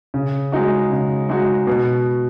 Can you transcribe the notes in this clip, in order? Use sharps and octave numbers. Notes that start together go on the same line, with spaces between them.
C#3
G#3 D#4 F#4
C#3
G#3 D#4 F#4
B2